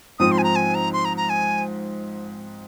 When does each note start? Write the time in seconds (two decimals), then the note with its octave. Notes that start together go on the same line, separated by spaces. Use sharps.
0.19 G#2 F3 C4 D#6
0.32 C6
0.38 G#5
0.44 A#5
0.56 G#5
0.75 A#5
0.93 C6
1.05 A#5
1.17 A#5
1.29 G#5